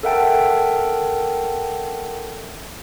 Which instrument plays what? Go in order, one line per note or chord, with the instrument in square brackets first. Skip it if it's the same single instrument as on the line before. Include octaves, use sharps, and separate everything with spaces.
[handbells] A4 A#4 E5 F#5 G5 A5